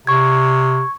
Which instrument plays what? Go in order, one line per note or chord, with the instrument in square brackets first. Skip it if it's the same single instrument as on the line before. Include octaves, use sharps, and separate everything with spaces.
[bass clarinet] C3 [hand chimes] C#6 G#6